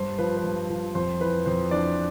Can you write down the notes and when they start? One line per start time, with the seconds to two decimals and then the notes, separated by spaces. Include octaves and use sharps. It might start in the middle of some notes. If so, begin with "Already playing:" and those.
Already playing: G2 C5
0.19 F3 B4
0.37 B4
0.44 G2
0.70 F3
0.95 F2 C5
1.20 E3 B4
1.46 F2 C5
1.71 E3 D4 D5